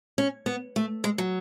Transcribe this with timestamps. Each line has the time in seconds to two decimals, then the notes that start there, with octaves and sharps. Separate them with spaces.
0.18 C#4
0.46 B3
0.76 A3
1.04 G#3
1.18 F#3